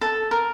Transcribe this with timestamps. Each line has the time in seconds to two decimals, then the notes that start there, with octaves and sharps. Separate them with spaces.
0.01 A4
0.31 A#4